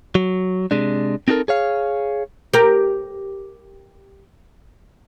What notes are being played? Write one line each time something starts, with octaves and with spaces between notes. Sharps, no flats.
F#3
C3 G#3 D4
C4 D#4 F#4 A4 A#4
G#4 C#5 F5
G4 A#4